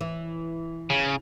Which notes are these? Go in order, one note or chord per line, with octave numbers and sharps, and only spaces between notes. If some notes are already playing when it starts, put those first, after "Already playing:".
E3
C#3